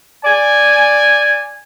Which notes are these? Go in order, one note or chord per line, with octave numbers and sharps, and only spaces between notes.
D5 G#5